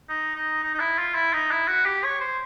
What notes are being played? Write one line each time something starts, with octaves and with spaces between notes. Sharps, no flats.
D#4
D#4
D#4
D#4
E4
F4
E4
D#4
E4
F#4
G4
C#5
C5